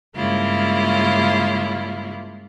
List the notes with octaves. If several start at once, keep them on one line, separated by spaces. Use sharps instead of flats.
G2 C#3 G#3 A#3 E4 F4